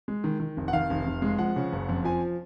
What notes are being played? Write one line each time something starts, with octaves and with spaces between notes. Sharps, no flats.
G#3
D#3
D#3
F1
F#5
D#3 F5
F1
F1
G#3
F3 F#5
C#3
F#1
F2
F3 G#5